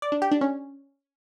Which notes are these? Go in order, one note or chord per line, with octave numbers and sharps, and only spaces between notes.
D5
D4
G4
D4
C#4